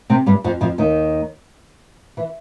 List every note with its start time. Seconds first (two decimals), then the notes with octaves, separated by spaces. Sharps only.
0.10 C3 C4
0.26 G2 G3
0.44 F2 F3
0.61 F2 F3
0.78 D#2 D#3
2.17 E3